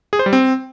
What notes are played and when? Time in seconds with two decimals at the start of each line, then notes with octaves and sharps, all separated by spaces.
0.13 G#4
0.19 C5
0.26 G3
0.33 C4